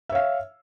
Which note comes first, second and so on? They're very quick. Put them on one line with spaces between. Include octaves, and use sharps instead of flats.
E5 C#5 F5